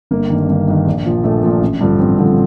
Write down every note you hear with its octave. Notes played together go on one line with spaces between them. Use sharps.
G1 A#3
G2 D#3
G1
G2 D#3
A#1 A#3
A#2 F3
A#1 A3
A#2 F3
A1
G2 D3 F3
A1 C4
G2 D3 F3